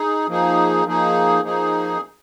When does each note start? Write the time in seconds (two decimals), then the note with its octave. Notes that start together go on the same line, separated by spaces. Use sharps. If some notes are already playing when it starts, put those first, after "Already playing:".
Already playing: D#4 G#4
0.28 F3 A#3 D#4 G#4
0.86 F3 A#3 D#4 G#4
1.44 F3 A#3 D#4 G#4